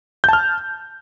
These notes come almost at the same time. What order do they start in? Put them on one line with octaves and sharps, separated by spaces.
G6 A5 F6